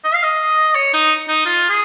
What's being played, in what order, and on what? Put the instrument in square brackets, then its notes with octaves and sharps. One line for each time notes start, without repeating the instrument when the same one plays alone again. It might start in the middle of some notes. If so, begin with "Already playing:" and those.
[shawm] D#5
F5
D#5
C#5
D#4
D#4
F4
G#4